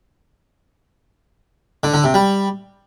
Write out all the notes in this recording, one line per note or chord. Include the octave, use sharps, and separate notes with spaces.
D3
D3
C3
G3